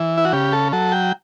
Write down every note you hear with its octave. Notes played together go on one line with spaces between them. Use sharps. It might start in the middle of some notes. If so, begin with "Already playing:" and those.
Already playing: E3
E4
F#4
C#3 G4
A4
F#3 A4
G5